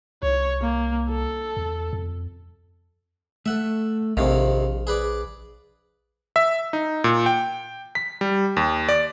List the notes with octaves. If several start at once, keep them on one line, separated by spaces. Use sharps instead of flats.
C2 C#5
A#3
A4
E2
F2
A3 A4 E5 F#5
A#1 F2 C3 D#3 F5
G#4 B4 D5
E5
D#4
A#2
G5
B6
G3
D#2
D5